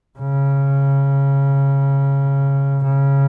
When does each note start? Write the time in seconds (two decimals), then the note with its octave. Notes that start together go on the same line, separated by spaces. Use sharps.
0.19 C#3
2.84 C#3